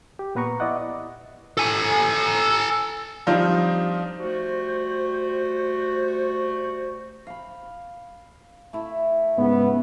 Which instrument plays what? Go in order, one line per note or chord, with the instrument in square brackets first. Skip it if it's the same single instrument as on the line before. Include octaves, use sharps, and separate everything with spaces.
[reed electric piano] G4
A#2 B3 B4 A#5 C#6
E4 D5 D#5 F#5
[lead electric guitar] A4 G#5
[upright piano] F3 G3 C4 D4 D#4 F4
[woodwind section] G3 A3 F#4 [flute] C5
[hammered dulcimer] F5 B5
A3 E4
[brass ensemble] G#2 C#3 B3